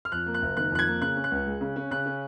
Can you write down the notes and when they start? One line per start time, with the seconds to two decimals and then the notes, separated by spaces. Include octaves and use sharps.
0.05 F6
0.12 F2 F#6
0.26 A#3
0.34 F#6
0.42 F#1
0.57 D#3 F#6
0.72 F2 F#6
0.79 G#6
0.87 A#3
1.01 C#3 F#6
1.16 C#4
1.24 F#6
1.31 C#2
1.46 G#3
1.61 C#3
1.76 C#4
1.91 C#3 F#6
2.06 C#4